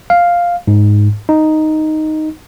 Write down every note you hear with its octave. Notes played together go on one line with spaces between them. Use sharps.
F5
G#2
D#4